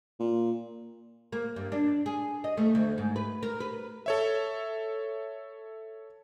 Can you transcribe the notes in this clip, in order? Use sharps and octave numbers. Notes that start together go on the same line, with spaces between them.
A#2
A#3
G2
D4
G#4
D#5
A3
D2
G#2
B4
A#4
B4
A4 C#5 E5